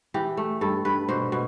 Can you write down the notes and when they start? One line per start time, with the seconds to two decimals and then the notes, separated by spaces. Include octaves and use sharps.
0.14 E3 G4
0.37 A3
0.61 G2 A4
0.85 G2 B4
1.09 B2 C5
1.32 B2